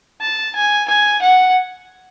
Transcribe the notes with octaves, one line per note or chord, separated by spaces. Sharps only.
A5
G#5
G#5
F#5